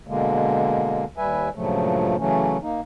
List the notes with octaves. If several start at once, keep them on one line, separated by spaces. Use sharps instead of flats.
B2 D3 G#3 A#3
D#2 G3 B4 E5 G#5
G2 A#2 C#3 F3 F#3 A3
C#3 E3 F#3 A3 C#4
A#3 D#4